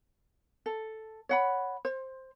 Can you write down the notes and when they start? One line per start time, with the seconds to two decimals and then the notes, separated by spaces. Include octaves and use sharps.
0.66 A4
1.29 C#5 F#5 B5
1.85 C5